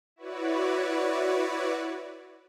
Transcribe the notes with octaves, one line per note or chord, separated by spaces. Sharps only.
E4 F#4 B4 C#5 D5